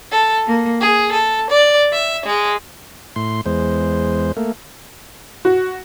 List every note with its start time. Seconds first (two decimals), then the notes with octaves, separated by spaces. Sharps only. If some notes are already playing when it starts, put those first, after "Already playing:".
0.12 A4
0.46 A#3
0.81 G#4
1.12 A4
1.50 D5
1.93 E5
2.26 G#3
3.16 A2 C6
3.46 E2 G#3 C5
4.37 A3 A#3
5.45 F#4